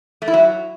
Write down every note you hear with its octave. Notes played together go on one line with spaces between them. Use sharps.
A3
E4
F#3